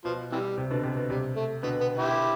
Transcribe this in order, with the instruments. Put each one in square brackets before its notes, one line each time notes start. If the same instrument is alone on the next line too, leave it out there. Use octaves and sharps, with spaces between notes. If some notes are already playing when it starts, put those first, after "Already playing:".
[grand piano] B2 [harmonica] F3
[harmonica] C3 E3 G3
[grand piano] C3
B2 D3
C3
B2
[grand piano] C3 [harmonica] G3
[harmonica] A3
[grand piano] B2 D3 [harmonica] B3
[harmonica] B3
E4 G4